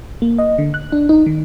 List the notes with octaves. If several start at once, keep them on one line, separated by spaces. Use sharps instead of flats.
A#3
D#5
D3
F#6
D4
D#4
D#3